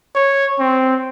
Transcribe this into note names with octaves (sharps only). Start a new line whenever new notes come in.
C#5
C4